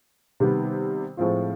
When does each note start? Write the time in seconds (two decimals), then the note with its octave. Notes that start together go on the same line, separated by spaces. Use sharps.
0.40 C3 D#3 G3 B3
1.17 A2 F3 G#3 C4 F4